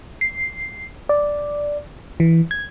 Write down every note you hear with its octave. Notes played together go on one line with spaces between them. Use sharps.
C7
D5
E3
G#6